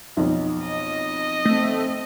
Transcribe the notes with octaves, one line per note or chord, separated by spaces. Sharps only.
B1 F2
D#5
A3 C4